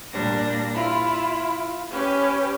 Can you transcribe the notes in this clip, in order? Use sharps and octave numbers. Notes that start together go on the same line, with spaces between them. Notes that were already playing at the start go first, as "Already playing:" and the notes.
A#2 G3 D4 A#6
E4 F4
C#4 G4 B4